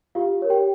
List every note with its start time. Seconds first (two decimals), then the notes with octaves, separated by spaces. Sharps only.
0.15 F4 G4 F5
0.42 A#4 C#5
0.50 G4 G5